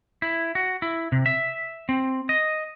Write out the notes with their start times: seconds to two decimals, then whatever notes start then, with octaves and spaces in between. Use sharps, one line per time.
0.22 E4
0.55 F#4
0.82 E4
1.12 C3
1.26 E5
1.89 C4
2.29 D#5